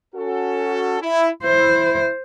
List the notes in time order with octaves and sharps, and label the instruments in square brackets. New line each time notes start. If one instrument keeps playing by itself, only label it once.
[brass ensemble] C#4 F#4 A4
E4
[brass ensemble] E4 [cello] C5